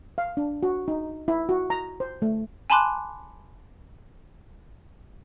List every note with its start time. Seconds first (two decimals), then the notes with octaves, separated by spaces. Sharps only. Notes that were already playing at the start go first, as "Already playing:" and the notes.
0.18 F5
0.37 D4
0.63 F#4
0.88 D#4
1.28 E4
1.49 F#4
1.70 A#5
2.00 C5
2.22 A3
2.70 G#5 A5 B5 C6 D6 F#6